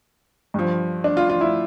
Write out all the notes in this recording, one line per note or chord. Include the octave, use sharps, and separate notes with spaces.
G2 F3
D4
F4
F4
E4